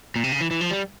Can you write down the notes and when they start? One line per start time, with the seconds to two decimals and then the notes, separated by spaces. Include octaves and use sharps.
0.16 A#2
0.24 C3
0.32 C#3
0.41 E3
0.51 E3
0.61 F3
0.71 G3